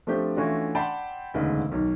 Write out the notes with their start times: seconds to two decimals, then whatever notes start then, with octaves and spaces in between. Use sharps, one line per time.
0.07 F3 A3 C4 D4 G4 G6
0.37 E3 A3 C#4 D4 F4 F#4
0.75 D5 F#5 G5 A5 B5 C6
1.34 E1 D2 G#2 C#3 B4 D#5
1.72 B1 D#3